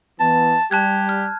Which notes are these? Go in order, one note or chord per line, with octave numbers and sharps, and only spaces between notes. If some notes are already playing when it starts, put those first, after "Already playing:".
E3 B3 A5
G3 G4 A5 F#6 G#6
F6